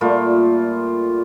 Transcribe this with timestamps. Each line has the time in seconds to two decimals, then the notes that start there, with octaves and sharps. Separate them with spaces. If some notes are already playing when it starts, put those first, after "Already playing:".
0.01 A#2 G3 A3 F4